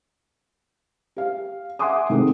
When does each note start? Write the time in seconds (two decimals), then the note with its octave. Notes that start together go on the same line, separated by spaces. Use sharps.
1.16 G4 F5
1.79 E5 F#5 G#5 C6 D6 D#6
2.10 C3 D#3 G#3 A3 C4